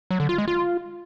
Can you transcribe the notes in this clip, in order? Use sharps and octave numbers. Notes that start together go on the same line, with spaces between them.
F#3
D3
F4
G#3
F4